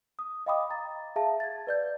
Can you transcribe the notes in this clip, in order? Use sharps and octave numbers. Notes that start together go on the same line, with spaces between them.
D#6
D#5 F5 G5 B5 D6 D#6
A#5 A6
G#4 E5 F5 A5
G#6 A6
B4 D5 G6